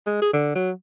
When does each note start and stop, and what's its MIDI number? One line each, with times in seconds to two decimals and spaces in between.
0.06 0.21 56
0.21 0.31 68
0.33 0.52 50
0.55 0.71 54